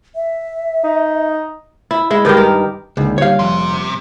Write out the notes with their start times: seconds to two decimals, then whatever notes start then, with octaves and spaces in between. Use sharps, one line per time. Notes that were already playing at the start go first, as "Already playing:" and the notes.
0.15 E5
0.84 D#4
1.91 E4
2.11 G#3 E4
2.25 G2 D#3 G#3 G4
2.37 A#4
2.97 C#2 A#2 D3 D#3
3.18 G3 G4 C#5 F5 G6
3.39 F1 A#1 C3